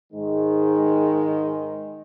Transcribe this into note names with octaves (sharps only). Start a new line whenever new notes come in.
G#2 D#3 G#3